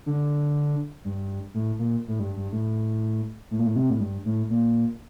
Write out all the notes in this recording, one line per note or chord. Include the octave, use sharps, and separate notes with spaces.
D3
G2
A2
A#2
A2
G2
G2
A2
A2
A#2
A2
C3
A2
G2
A2
A#2